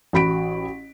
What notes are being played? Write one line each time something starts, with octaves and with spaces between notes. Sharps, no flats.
A1 F#4 B5 B6 D7